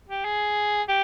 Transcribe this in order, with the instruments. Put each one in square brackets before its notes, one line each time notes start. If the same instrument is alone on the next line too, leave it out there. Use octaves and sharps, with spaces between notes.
[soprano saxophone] G4
G#4
G4